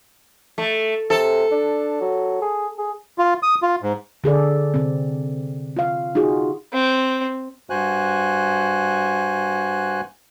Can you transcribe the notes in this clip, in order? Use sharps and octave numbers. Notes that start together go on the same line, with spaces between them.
A3
C3 A4
D4
F#3
G#4
G#4
F4
D#6
F4
G#2
D3 G#4 A4 D5
C3 C4
F4 F5
D#4 F4 F#4 G#4
C4
G2 F#4 C5 G#5 F#6